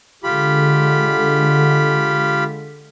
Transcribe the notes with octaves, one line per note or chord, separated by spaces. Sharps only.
D3 G#3 F4 G4 B5